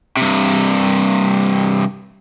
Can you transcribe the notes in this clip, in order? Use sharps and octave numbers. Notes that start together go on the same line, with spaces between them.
G2 C3